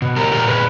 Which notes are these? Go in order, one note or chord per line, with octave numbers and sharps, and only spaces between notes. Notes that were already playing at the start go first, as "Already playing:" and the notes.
B2
G4 A#4
A#2 G4 A#4
G#4 B4